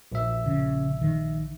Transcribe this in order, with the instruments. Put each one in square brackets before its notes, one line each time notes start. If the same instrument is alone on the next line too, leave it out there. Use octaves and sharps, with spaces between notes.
[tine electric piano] A#1 E5
[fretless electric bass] C#3
D#3